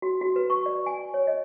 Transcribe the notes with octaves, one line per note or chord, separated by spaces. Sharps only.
F#4
F#4
B4
C#6
D5
G#5
C#5
D#5